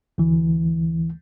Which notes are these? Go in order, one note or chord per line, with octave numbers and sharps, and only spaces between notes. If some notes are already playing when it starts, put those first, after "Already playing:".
D2 E3